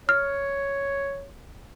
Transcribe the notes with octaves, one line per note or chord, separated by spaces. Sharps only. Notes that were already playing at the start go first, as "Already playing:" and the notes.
C#5 F6